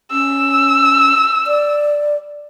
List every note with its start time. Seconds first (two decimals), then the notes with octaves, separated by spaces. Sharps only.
0.12 C#4 E6
1.47 D5